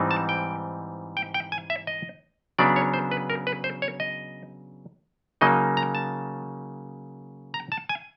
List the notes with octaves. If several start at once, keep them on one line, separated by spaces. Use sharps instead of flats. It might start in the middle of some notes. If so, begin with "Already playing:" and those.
Already playing: G#2 E3 G3 C4 D#4
A5
G5
G5
G5
G#5
E5
D#5
C#3 F#3 B3 D4 D5
C#5
C5
B4
A#4
B4
C5
C#5
D#5
C#3 F#3 A#3 D#4 D#5
A#5
A5
A#5
A5
G#5